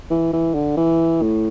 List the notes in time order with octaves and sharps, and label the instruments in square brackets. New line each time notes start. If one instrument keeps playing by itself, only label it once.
[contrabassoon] E3
E3
D3
E3
A2